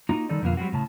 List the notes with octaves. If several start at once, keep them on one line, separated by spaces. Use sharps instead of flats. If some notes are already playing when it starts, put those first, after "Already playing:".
A#3 D#4 F4 F#4
D#3 G3 D#4 A4 D5
F2 B2 D3 A#3 F4
F#3 G3 A3 C4 F#4
A2 C#3 A5